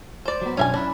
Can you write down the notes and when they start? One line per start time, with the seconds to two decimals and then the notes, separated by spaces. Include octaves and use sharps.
0.25 C5 D5
0.42 F#3 B3
0.57 B1 F#2 C#4 D4 E5 G#5
0.74 C#4 D4 E4